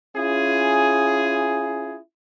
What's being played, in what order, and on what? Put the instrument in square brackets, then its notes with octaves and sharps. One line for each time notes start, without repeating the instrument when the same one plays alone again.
[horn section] C#4 E4 F4 G#4